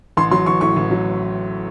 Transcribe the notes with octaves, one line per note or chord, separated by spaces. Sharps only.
A1 C6
F#3 C6
A1 C#6
A2 C#6
A1
F#3